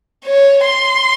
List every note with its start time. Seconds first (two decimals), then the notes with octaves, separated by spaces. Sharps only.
0.26 C#5
0.66 C6